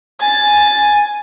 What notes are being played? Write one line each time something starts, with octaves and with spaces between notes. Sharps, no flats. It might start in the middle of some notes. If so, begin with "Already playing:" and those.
G#5 A6